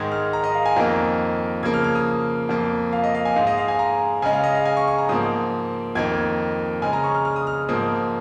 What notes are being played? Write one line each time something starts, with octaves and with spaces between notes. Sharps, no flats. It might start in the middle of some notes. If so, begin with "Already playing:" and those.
Already playing: G#2 D#3 G#3 G#6
F6
A#5
D#5
F5
G#5
F2 D#3 A#3 A#5
C#3 F3 A#3 G#6
F6
F6
D#6
F2 F3 A#3
F5
D#5
F5
G#5
G#2 G#3 F5
D#5
F5
G#5
A#5
C#3 G#3 G#5
F5
D#5
F5
G#5
C#6
C#6
A#5
G#2 F3 A#3 D#6
F2 D#3 A#3 G#6
C#3 G#3 G#5
A#5
C#6
F6
F6
D#6
F6
G#2 F3 A#3 D#6